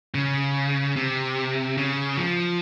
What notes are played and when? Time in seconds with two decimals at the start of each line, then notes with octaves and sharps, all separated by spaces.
0.14 C#3
0.96 C3
1.77 C#3
2.17 F3